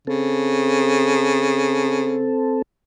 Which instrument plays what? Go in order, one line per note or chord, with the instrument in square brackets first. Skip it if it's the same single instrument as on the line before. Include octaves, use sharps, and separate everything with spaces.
[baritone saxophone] C#3 [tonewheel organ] C4 A4